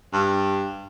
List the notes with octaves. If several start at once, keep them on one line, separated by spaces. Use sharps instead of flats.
G2